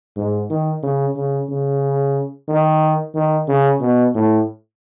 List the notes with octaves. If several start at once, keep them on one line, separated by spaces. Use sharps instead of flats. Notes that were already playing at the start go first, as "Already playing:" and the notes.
G#2
D#3
C#3
C#3
C#3
D#3
D#3
C#3
B2
A2